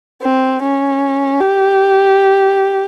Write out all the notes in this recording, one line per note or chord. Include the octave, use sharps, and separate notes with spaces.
C4
C#4
G4